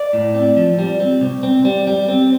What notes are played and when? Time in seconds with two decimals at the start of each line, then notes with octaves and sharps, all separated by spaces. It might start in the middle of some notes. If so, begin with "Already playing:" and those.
Already playing: D5
0.13 A2
0.35 C4
0.57 F3
0.79 G3
1.00 C4
1.21 C2
1.43 C4
1.65 G3
1.87 G3
2.08 C4